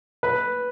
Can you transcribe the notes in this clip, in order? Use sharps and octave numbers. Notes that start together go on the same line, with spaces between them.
B4